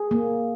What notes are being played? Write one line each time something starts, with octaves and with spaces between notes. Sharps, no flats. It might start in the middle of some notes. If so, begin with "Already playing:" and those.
Already playing: G#4
A#3